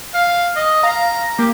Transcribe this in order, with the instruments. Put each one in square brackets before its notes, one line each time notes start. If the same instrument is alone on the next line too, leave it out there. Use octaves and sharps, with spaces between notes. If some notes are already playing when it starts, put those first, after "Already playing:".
[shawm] F5
D#5
[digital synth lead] F5 [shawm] A#5
[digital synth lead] A#3 [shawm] G4